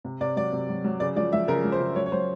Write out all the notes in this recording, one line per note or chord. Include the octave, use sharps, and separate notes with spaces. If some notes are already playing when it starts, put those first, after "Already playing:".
C3
C3 D5
F#3 D5
C3
F#3
F#3
C#3 D5
F3 D5
F3 E5
C#3 A#4
F3
C5
C#3
F#3 C#5
C#5
F#3 C5